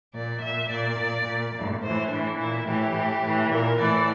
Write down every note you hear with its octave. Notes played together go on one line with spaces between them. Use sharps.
A#2 D5
A#2 E5
A#2 D5
A#2
A#2
A#2
A2 E3 C5
A2 E3 D4
A#2 E4
A2 E3 G4
A2 E3
A2 E3
A#2 A#4
A2 E3 D5